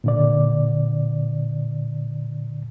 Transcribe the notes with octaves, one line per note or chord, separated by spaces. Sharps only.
A#2 D3 D5